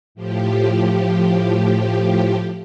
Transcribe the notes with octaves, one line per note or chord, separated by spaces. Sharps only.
A2 F3 G4